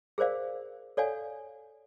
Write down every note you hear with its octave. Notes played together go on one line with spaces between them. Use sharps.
G#4 A#4 C5 D5 F5
A4 C#5 D5 F5 F#5 G#5